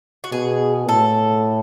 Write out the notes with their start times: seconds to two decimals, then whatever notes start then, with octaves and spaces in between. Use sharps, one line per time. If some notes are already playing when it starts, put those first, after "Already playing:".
0.24 F#4
0.32 B2 G#4
0.89 A2 A4